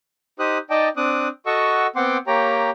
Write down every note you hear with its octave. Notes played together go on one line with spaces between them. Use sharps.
D#4 G4 C5 D#6 F#6
D#4 D5 D#5 G5 A5
C4 D4 D6 D#6 F#6
F#4 A4 D#5 F#5 C#6 E6
B3 C4 F#5 G5 C6 D6
A#3 G4 C#5 G5 A#5